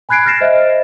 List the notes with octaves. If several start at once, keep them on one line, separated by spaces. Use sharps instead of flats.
G#5 B5 F#6 G#6 C7 D7
F6 A6 A#6 C7 E7
C5 D#5 E5